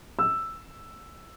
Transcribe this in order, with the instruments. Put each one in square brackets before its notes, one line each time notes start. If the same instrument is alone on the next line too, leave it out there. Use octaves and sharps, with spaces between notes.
[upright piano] E6